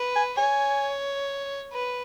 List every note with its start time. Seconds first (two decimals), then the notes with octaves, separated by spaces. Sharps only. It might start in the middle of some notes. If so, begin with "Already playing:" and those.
Already playing: B4
0.16 G#5
0.38 C#5 G#5
1.73 B4